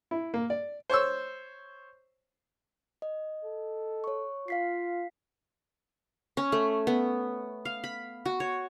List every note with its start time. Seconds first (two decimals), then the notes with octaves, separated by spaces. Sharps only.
0.11 E4
0.34 A#3
0.50 D5
0.90 C5 C#5 C#6 E6
3.02 D#5
3.45 A4
4.04 C#5 C#6
4.48 F4 F5 B6 C7
6.37 C#4
6.52 A3
6.87 B3
7.65 F5
7.84 B5
8.25 F#4
8.40 C#5